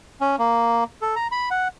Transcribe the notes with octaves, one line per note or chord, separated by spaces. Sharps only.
C#4
A#3
A4
A#5
B5
F#5